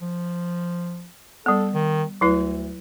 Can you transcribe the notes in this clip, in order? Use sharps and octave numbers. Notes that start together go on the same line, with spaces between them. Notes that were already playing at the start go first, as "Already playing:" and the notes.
F3
G3 B3 A4
D#3
D2 F#3 E4 B4